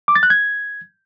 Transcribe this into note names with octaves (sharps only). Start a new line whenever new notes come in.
D6
A6
F#6
G#6